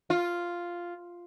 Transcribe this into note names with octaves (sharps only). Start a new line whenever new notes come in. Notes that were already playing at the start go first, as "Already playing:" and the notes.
F4